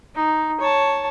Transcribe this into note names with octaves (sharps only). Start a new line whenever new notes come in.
D#4
C#5 A5